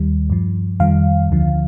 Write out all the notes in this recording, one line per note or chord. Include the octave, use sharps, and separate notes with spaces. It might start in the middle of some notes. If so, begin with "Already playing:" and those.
Already playing: D#2 D#3 G3
G2 F3
F2 D#3 G3 F5
D2 D3 F3